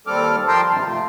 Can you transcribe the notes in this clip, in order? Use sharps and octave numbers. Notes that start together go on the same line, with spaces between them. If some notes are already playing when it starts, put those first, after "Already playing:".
D#2 G3 C4 A4 D6 F6
F3 A#4 G5 A5 A#5 C6
G2 C3 D#3
C3 A3 F4